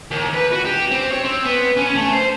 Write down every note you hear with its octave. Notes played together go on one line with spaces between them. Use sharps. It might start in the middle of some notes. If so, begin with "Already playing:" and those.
D#2
B4
F#4
G4
C4
C#5
C4
B3
C#4
A3
C5